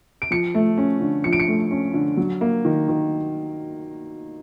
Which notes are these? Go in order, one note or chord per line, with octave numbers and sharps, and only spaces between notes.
D7
F3 C#7
A3
C#4
D3
F3 C#7
D7
C#7
A3
C#4
D3
F#3
A#3
D#3
D#3